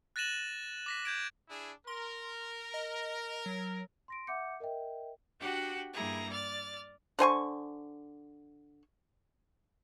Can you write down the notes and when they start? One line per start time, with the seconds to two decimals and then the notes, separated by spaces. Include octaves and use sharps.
0.16 F#6 A6 A#6 D#7 E7 F#7
0.86 D6 A#6 B6
1.05 G6 G#6 D7
1.49 D4 E4 G#4
1.87 A#4 C6
2.74 D#5
3.46 F#3
4.08 C6 A#6 D7
4.27 E5 F#5 D6 G6 C#7
4.60 A#4 D#5 E5 G5
5.39 D4 F#4 G4 F#5 G5
5.93 G2 G3 A#3 E4 G#4 A#5
6.29 D5 F6 A6
7.19 D3 C5 G#5 C#6